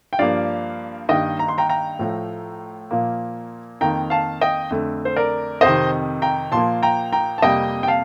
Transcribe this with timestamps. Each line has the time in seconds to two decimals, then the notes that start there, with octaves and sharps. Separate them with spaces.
0.13 G5
0.19 G2 F3 A#3 D5 F5
1.09 G2 D#3 A#3 D#5 G5
1.39 A#5
1.48 C6
1.58 G5 A#5
1.69 G5 A#5
1.99 A2 F3 A3
2.91 A#2 F3 A#3
3.81 F2 D#3 A#3 G5 A#5
4.10 F5 A5
4.41 D#5 G5
4.71 F2 D3 A3
5.05 C5
5.16 A#4 D5
5.61 F2 C3 D#3 C5 D#5
6.22 G5 A#5
6.52 A#2 F3 A#3 A5 C6
6.83 G5 A#5
7.12 G5 A#5
7.38 A5
7.42 F2 C3 G3 A#3 D#5 G5
7.83 G5
7.88 F5 A5